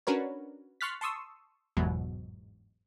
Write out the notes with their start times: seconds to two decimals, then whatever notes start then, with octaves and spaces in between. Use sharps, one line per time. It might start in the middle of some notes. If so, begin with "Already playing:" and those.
0.07 C#4 D4 F#4 A#4 B4 C#5
0.81 C6 C#6 F6 F#6 A6 B6
1.01 A5 C6 C#6 D#6 E6
1.77 G1 E2 G#2 B2 F#3